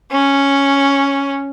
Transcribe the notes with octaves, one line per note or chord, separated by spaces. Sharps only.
C#4